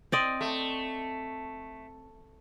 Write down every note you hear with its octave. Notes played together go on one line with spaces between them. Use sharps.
C4 D5 D#5
A3